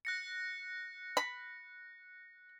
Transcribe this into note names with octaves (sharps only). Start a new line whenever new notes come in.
F#6 A#6 C#7
B5